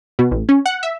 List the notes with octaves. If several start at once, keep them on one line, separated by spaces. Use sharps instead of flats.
B2
A1
C#4
F#5
E5